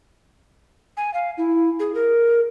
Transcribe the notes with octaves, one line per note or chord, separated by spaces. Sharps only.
G#5
F5
E4
G#4
A#4